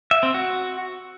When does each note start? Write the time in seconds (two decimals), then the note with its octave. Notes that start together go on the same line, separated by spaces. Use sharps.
0.11 E5
0.23 C4
0.34 F#4